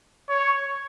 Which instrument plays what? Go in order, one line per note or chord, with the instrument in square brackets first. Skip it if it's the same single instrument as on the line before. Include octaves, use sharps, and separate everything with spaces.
[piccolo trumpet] C#5